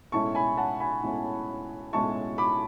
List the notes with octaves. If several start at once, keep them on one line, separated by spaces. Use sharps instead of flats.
B1 A2 G#3 C#4 E4 A5 C#6
G#5 B5
F#5 A5
G#5 B5
B1 A2 G#3 C#4 E4
B1 A2 G#3 C#4 E4 A5 C#6
B5 D6